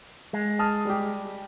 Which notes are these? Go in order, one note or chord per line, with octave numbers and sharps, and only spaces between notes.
G#3
A5 D#6 F6
G3 G4